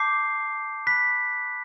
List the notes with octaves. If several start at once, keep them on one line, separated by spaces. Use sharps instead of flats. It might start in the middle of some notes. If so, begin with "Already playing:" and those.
Already playing: A5 D6 G6 C7
B5 F#6 B6